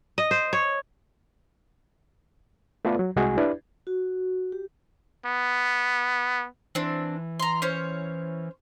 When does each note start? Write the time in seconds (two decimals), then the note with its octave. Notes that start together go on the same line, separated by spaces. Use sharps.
0.18 D#5
0.31 C5
0.53 C#5
2.85 A3 B3 F4 A4 B4 D5
2.99 F#3
3.16 C2 G#3 F#4 G#4 G#5
3.38 D4 E4 G4 B4 D5
3.87 F#4
4.52 G4
5.26 B3
6.75 E3 C4 D4
7.40 A#5 C6
7.62 C#4 C5 C#5